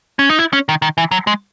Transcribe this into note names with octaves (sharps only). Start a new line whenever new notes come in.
C#4
D#4
E4
C#4
D#3
D#3
E3
F#3
G#3